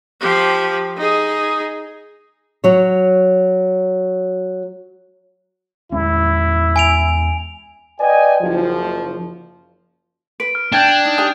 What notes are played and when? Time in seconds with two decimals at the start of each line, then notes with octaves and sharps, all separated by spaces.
0.20 F3 G4
0.97 D#4 G#4
2.64 F#3 C#5
5.92 E2 G#3 C#4 E4
6.76 G#5 D7 F7
8.00 B4 D5 D#5 G5 G#5
8.42 F#1 F3
10.40 B4 D7
10.55 F6
10.72 D4 G5 G6 G#6 E7
11.05 D#4
11.18 G4 G#5 D#6